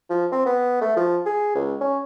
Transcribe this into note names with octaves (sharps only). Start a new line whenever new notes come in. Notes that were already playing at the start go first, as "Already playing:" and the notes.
F3
C4
B3
A3
F3
G#4
C#2
C#4